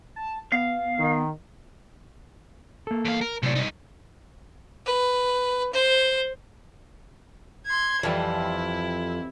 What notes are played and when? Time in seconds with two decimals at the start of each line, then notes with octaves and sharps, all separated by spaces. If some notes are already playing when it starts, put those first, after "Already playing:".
0.16 A5
0.52 B3 F5
0.98 D#3
2.87 A#3 A4
3.05 E2 F5
3.21 A#4
3.42 F#2 A2 C3 D5
3.55 G2 D#4
4.86 B4
5.73 C5
7.67 C6 G#6
8.03 F2 E3 G3 E4